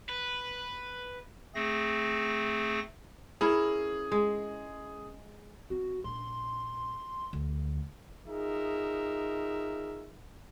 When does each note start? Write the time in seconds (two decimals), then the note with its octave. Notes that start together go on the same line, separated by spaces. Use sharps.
0.09 B4
1.55 A3 C4 G#4 A#6
3.41 C#4 E4 G#4 A#4
4.12 G#3
5.70 C4 F#4
6.04 A#1 C6
7.33 D2
8.27 D#4 F4 G#4 A#4 E5